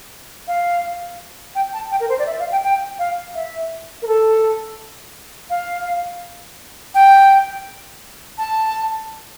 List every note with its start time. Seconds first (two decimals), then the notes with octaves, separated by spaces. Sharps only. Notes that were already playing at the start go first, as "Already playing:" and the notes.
0.48 F5
1.55 G5
1.73 A5
1.91 G5
2.00 A#4
2.09 C5
2.19 D5
2.27 E5
2.39 F5
2.52 G5
2.64 G5
2.99 F5
3.35 E5
4.02 A#4
4.07 A4
5.50 F5
6.95 G5
8.38 A5